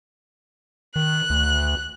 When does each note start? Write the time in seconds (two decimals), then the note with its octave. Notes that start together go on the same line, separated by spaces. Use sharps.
0.96 D#3 F#6
1.30 D2